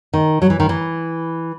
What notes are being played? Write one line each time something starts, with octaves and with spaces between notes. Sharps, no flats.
D#3
F#3
E3
D#3
E3